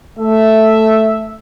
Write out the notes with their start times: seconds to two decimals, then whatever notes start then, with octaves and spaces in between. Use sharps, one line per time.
0.19 A3 E5